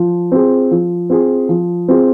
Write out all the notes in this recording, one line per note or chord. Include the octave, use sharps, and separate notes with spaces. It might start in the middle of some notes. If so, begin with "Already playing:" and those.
Already playing: F3
C4 F4 G#4
F3
C4 F4 G#4
F3
C4 F4 G#4